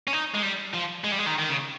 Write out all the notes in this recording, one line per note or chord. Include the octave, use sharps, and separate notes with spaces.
C#4
D#4
G#3
G3
F3
G#3
G3
G#3
D#3
D#3
C#3